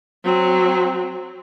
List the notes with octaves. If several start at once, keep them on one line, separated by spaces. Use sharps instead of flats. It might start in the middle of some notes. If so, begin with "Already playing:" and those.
F#3 C4